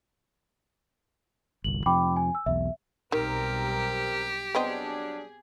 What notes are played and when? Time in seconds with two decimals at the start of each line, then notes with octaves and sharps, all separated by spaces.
1.64 G1 C2 F#7
1.86 F2 C3 F3 G5 B5 D6
2.16 G#5
2.35 E6
2.46 B1 E2 E5
3.12 B1 D#3 G3 C4 G4 A#4
4.55 F#3 G3 B3 C4 D4 G#4 D#5